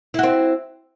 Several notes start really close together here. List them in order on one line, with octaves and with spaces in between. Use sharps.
E4 F#4 C4